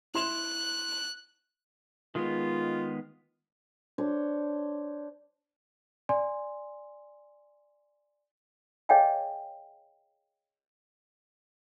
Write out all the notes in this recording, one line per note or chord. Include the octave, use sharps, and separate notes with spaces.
E4 C6 F#6 E7
D#3 G#3 B3 F4
D4 C5 C#5
D5 G#5 C6
G#4 C#5 D#5 F5 G5 G#5